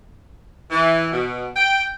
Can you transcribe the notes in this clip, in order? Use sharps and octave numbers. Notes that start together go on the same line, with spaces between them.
E3
B2
G5